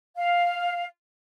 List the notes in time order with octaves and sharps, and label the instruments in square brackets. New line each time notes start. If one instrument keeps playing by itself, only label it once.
[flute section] F5